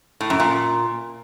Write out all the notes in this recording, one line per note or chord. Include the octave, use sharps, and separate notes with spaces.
A2
F#2
A#2